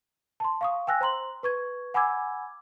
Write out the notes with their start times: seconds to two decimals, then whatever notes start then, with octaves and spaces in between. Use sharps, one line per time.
0.40 A5 C6
0.61 F5 C#6 D#6
0.87 G5 G#5 E6 F#6 A#6
1.01 C5 A#5 C6 F#7
1.43 B4 C#6 G#6
1.94 F#5 G#5 B5 D6 E6 G#6